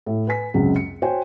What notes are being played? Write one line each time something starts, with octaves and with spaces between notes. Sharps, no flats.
A2
B4 G#5 B6
C#2 F#2 C3 F#3 G#3
C#7
F#4 C5 C#5 G5 G#5